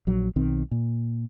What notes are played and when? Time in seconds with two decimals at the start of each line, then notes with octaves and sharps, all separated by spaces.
0.07 A#1 F#3
0.36 B1 D#3 C4
0.71 A#2